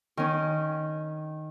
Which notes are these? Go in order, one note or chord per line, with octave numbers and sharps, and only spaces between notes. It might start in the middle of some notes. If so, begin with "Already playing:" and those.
D#3 C#4